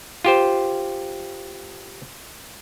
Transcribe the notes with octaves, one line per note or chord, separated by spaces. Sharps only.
F4 G4 C5